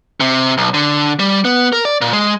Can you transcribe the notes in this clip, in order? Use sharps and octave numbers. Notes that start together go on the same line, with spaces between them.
C3
B1
D3
G3
B3
A#4
D5
A#2
G#3